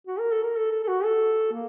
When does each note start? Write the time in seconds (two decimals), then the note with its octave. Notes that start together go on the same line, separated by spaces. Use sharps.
0.07 F#4
0.19 A#4
0.31 A4
0.44 A#4
0.56 A4
0.71 A4
0.83 A4
0.88 F#4
1.04 A4
1.53 A#3